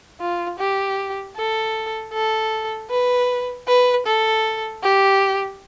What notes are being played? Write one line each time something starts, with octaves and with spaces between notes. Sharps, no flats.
F4
G4
A4
A4
B4
B4
A4
G4